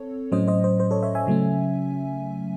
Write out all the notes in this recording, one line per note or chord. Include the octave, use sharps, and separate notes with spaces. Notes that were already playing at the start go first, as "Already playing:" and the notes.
Already playing: C4 A4 C#5
A2 F#3 C#4 C5 D#5
C5 D#5
C5
C5
A4 C#5
C#5 E5
E5 G#5
C#3 F#3 A3 C#4